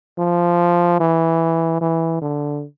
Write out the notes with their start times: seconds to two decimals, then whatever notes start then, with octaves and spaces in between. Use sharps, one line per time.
0.19 F3
1.00 E3
1.81 E3
2.22 D3